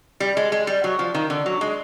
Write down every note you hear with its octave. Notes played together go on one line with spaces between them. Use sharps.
G3
G#3
G#3
G3
F#3
F3
D#3
D3
F#3
G#3